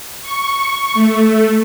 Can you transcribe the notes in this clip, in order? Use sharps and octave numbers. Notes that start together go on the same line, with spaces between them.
C#6
A3